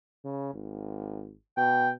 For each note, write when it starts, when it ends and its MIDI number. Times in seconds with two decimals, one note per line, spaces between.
0.25 0.54 49
0.54 1.34 32
1.57 1.93 47
1.57 1.89 79